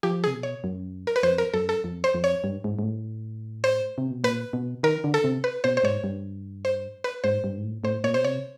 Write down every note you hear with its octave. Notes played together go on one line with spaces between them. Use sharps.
F3 G4
G#4
C3
B2
C#5
F#2
A#4
B4
F2 C5
A#4
F#2 A4
A4
F2
C5
F2
C#5
G2
G#2
G#2
A2
C5
C3
B2
A#2 B4
B2
D#3 A#4
D3
A4
C3
B4
B2 C5
C5
G#2 C#5
G2
C5
B4
G#2 C5
G2
G#2
A2
A2 C5
A#2 C#5
B2 C5
C3 C#5